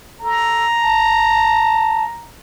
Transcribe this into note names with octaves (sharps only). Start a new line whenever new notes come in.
A4 A#5
A5